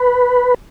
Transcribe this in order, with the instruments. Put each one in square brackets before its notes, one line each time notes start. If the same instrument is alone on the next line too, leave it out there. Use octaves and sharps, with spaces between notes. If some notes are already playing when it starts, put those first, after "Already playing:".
Already playing: [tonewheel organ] B4